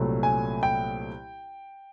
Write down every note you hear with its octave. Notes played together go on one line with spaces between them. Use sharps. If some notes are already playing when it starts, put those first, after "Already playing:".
Already playing: C2 A#2 F#3 A3
G#5
G5